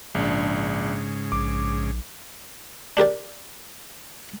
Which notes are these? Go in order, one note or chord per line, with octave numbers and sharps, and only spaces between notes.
A#1 G#2 C#3 D4
A#1 D6
D4 G4 A#4 D5